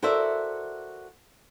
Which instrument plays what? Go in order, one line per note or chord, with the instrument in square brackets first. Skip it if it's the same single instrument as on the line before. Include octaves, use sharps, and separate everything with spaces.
[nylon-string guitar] F#4 A4 A#4 C5 D5 E5